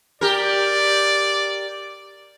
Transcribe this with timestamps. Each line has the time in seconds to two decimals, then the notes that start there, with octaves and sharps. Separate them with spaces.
0.21 G4 A#4 D5